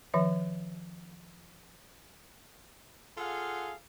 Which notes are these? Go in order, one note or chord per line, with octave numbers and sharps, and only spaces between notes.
D#3 F3 E5
F4 G#4 A4 F5 F#5